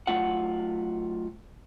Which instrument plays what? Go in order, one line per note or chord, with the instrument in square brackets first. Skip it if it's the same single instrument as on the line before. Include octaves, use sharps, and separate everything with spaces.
[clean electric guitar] F#3 A3 F4 F#5